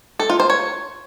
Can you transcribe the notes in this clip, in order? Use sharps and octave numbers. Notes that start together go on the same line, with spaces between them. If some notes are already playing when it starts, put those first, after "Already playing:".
A4
F4
C5
C#5